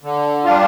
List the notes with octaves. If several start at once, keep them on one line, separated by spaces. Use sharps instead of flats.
D3
G3 D4 F4